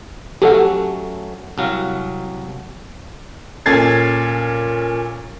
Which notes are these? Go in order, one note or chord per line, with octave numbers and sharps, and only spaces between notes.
F#3 A3 C#4 G4 A4 F#5
C2 F#3 F5
A#2 C#4 A4 G#6 A6 C7